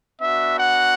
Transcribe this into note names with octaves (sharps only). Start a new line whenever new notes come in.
B3 D4 F#4 E5
F#5